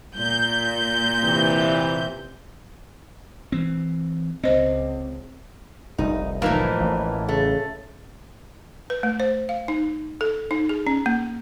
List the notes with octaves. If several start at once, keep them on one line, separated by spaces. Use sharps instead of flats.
A#2 G6
C3 E3
E3 C4
C#2 C4 C5 D#5
F1 C2 D#4
A2 E3 F3 A#3 D#4 A#4
A1
C#3 A3
B4
A3
C5
F5
D#4
A4
D#4
G#4
C#4
A#3